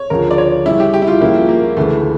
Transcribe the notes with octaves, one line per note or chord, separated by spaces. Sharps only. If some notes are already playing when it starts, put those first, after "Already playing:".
Already playing: C#5
D2 C#3 F3 A#4
D5
C#5
C#3 G3 C#4 E4
G4
G4
E4
F4
C#2 C#3 F3 A#3 C#4 E4
A#3
D2 C#3 E3 A3